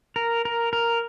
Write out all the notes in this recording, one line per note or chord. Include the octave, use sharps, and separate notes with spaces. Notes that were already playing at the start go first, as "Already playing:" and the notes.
A#4
A#4
A#4